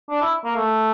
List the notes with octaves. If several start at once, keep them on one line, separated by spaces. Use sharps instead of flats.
D4
E4
A#3
A3